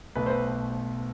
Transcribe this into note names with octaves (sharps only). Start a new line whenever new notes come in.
B1 B2 A3 B4
C5
B4